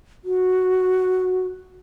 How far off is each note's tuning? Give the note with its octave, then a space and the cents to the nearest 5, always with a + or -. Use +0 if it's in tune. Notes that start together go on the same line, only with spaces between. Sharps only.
F#4 +0